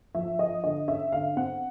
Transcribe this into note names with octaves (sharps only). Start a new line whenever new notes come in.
F3 E5
F3 D#5
D3 D#5
C#4 E5
D3 F5
C4 F#5